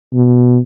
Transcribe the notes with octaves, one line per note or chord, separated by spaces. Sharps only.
B2